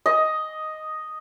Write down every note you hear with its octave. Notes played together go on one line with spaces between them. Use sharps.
D#5